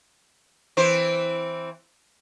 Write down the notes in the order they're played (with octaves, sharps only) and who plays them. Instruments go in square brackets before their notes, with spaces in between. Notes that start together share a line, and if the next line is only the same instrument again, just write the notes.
[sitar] E3 C4 C5